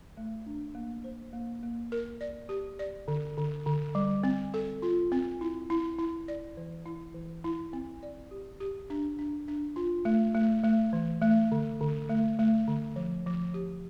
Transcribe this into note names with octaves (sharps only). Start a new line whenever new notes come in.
A3
D4
A#3
C5
A#3
A#3
A#4
D5
G4
D5
D3
D3
D3
G3
C4
A4
F4
C4
E4
E4
E4
D5
E3
E4
E3
E4
C4
D5
G4
G4
D4
D4
D4
F4
A3
A3
A3
E3
A3
D3
D3
A3
A3
D3
F3
F3
G4